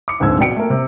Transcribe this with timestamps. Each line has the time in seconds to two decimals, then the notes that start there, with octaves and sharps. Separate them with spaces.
0.08 D6 C#7
0.20 D1 G#2 D3 C4 E6 G#6
0.39 B2 B3 D5 G5 C#7 D7
0.56 A3 A#3
0.70 C3